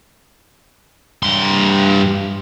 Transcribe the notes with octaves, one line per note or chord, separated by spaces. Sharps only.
G2 C6